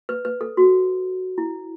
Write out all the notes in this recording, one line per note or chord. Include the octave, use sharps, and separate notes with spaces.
B4
B4
A4
F#4
E4